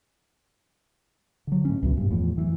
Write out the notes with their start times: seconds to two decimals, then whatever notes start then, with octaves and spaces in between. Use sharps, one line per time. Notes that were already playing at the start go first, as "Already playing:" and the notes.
1.47 D3 F#3
1.65 A2 C#4
1.83 C#2 F#2 B2
1.97 D#1 G2
2.11 E2 A2 F3
2.37 F#2 E3